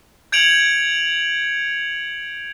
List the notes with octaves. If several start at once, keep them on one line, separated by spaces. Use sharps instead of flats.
G6 G#6 C#7 D7 F7 F#7